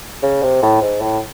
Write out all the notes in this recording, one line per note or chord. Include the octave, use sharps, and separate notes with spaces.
C#3
C3
A2
G#2
A2